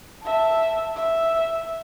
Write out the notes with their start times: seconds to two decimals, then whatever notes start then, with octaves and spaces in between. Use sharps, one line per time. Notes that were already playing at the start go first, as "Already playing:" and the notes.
0.23 E5 A5
0.96 E5